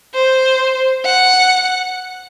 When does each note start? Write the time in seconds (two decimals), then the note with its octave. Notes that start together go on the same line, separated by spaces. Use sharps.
0.14 C5
1.05 F#5